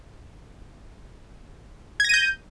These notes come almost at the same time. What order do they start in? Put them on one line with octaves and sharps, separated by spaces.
G#6 A#6 D#7 G6